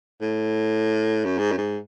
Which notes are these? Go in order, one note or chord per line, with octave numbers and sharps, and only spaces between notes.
A2
F#2
G#2
F#2
G#2